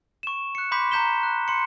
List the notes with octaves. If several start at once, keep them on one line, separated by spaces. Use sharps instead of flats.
C#6 E7
F#6 C#7
B5 C6 D6 G6 B6
A#5 C#6 G6 B6 E7 G7
F#6
C6 C#7